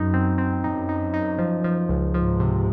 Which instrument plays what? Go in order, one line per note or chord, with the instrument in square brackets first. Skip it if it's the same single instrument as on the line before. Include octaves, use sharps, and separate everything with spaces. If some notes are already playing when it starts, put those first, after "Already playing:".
Already playing: [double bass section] F#2 [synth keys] D#4
[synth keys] C4
C4
[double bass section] F#2 [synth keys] D#4
[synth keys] D#4
D#4
F3
F3
C#2
[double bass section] G#2 [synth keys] F3
[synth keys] C3